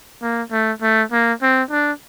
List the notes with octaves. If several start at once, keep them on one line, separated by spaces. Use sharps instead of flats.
A#3
A3
A3
A#3
C4
D4